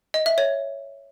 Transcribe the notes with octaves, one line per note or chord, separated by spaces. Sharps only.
D#5
E5
C#5